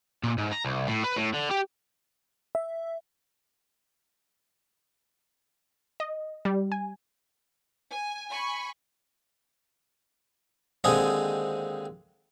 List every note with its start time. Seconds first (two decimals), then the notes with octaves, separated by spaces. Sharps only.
0.24 A#2
0.38 G#2
0.52 A#5
0.65 C2
0.87 A2
1.04 B4
1.17 A2
1.34 D3
1.51 G4
2.55 E5
6.00 D#5
6.45 G3
6.72 G#5
7.93 G#5
8.29 G#5 B5 C#6
10.84 D#2 D3 G#3 C4 G#5 D#6